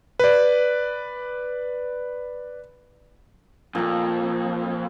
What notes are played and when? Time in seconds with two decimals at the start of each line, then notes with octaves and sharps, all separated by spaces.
0.20 B4 D5
3.75 F2 A#2 A#5